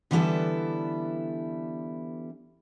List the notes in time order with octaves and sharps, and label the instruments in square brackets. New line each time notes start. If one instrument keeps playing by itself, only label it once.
[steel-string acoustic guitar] D3 E3 G3 B3 E4 A4